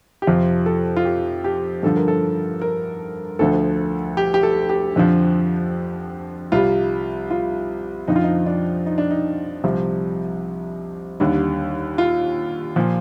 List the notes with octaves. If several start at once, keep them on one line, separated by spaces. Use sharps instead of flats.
G4
F2 C3 F3 F4
A4
F4
G4
G4
G2 D3 F3 A4
A#4
A4
A#4
D2 D3 F3 A4
G4
G4
A4
G4
F2 D3 F3
C2 C3 G3 F4
F4
F2 D3 F3 D#4
F4
D#4
D4
D#4
D4
D#4
C2 C3 F3
D#2 D3 G3
F4
A#2 F3